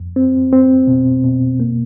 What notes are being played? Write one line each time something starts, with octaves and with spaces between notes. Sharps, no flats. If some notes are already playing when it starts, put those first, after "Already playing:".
Already playing: F2
C4
C4
B2
B2
A#3